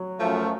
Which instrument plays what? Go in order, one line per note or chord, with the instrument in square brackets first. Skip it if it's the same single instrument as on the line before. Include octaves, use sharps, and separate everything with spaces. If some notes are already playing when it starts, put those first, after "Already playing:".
Already playing: [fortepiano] F#3
[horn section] F#2 F3 A3